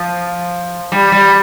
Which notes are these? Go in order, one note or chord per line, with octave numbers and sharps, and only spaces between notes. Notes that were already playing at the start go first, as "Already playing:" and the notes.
Already playing: F3
G3
G3